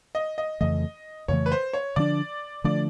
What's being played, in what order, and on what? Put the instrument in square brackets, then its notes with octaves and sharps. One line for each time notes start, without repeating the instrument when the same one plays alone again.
[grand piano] D#5
D#5
[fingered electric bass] F2 C#3 E3 A3 [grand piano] D#5
[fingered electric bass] F2 C#3 E3 A3 [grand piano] C#5
[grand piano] B4
C5
C#5
[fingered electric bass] D3 F3 A3 D4 [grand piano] D5
[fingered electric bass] D3 F3 A3 D4 [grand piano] D5